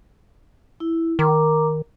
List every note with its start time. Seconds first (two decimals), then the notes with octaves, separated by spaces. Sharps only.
0.80 E4
1.19 D#3 A#4 A#5 D6